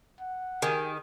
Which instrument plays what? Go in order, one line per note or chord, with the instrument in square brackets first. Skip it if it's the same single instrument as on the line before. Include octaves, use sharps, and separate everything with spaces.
[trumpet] F#5
[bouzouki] D#3 [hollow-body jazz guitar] G4 G#4